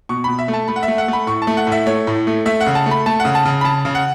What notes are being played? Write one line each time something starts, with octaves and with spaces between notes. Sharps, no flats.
B2 C#6
B2 B5
E5
A3
A5
A3 B5
F#5
E5
A3
F#5
A3 B5
A2 C#6
A5
A3
F#5
A2 E5
A3 C#5
A2
A3
A3 E5
F#5
C#3
A5
A3
B5
A3 A5
C#3 F#5
A5
C#3
B5
C#3 A5
C#3
F#5